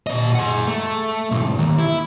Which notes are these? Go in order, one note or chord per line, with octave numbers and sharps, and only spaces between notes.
A#2 D#5
G#4 F#5
A3
B1 G#2
D#2
E4